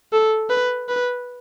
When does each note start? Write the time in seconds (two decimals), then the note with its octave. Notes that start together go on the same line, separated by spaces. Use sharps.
0.13 A4
0.50 B4
0.89 B4